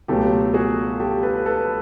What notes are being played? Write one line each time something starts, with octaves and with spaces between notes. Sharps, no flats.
C#2 B2 F#3 A3 G4 A4
F#4 G#4
G4 A4
A4 B4
A4 B4